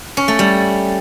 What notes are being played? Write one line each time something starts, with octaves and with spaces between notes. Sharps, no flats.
C#4
A3
G3